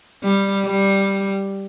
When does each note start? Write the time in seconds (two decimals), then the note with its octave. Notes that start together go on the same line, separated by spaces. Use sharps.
0.23 G3
0.66 G3